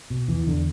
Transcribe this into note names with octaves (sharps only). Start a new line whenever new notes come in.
B2
E2 E3
E2 D3